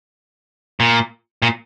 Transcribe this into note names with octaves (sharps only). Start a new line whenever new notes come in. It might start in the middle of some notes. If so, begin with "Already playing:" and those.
A#2
A#2